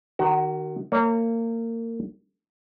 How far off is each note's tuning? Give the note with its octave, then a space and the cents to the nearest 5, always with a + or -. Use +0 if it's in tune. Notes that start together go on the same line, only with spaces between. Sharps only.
D#3 -20 F#4 +30
A#3 -30 C#5 +0